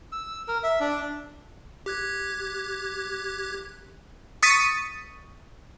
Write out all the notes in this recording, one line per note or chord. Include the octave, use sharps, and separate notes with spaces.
E6
A#4
E5
D4
G4 F#6 G#6
C#6 D#6 A6 B6 C#7 D#7